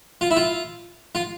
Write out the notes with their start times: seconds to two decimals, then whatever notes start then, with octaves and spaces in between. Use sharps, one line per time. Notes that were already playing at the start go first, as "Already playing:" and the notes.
0.21 F4
0.31 E4
0.36 F4
1.15 F4